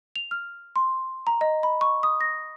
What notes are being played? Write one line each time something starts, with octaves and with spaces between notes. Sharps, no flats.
F7
F6
C6
A#5
D#5
B5
C#6
D#6
A#6